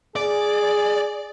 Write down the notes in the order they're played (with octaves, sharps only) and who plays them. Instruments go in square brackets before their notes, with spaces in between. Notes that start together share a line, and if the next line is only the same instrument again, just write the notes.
[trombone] G#4 [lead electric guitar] D5